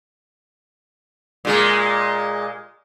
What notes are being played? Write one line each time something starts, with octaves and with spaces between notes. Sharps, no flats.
A#2 G#3